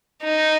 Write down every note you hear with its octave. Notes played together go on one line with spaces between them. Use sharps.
D#4